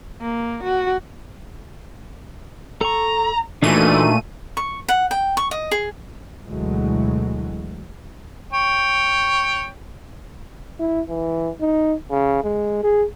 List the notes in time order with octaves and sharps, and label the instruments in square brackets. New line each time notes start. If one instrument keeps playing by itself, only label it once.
[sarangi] A#3
F#4
[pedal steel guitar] A4 C#6 [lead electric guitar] A#5
[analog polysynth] A#2 A3 D#7 [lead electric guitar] E3 [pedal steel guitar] D4 D#4 F#4
[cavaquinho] C#6
F#5
G5
C#6
D#5
G#4
[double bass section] D2 B2 E3 F#3 G#3 A3
[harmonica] C#5 G5
[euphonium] E4
E3
D#4
C#3
G#3
G#4